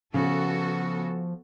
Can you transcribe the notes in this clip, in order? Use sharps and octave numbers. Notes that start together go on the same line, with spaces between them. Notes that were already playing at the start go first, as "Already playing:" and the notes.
C#3 F3 B3 F#4 A4